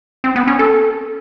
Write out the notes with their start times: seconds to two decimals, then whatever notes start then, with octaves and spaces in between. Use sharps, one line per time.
0.24 C4
0.36 B3
0.47 C#4
0.59 A4